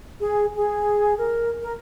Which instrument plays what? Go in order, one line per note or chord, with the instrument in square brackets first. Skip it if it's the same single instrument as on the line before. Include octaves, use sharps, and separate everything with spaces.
[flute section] G#4
G#4
A#4
A#4